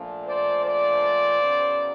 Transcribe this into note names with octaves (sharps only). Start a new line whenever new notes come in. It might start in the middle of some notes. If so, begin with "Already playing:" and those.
Already playing: A#2 F3 A3 D4
C5 D5
C5 D5
E2 C#3 F#3